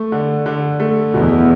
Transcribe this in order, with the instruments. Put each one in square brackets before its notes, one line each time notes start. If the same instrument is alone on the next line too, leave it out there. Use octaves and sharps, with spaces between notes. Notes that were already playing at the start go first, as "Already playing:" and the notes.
Already playing: [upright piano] A3
D3
D3
A3
[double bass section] E2 [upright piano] B2